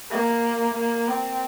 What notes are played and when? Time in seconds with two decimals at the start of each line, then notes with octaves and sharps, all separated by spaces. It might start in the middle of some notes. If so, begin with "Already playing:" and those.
0.10 A#3
0.74 A#3
1.08 C4